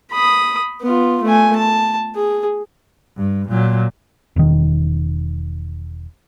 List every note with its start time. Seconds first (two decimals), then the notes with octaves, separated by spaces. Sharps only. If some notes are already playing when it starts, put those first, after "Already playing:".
0.12 B5 D#6
0.82 B3 F4
1.23 A3 G#5
1.56 A5
2.15 G#4
3.17 G2
3.49 A#2 F#3
4.36 E1 D#3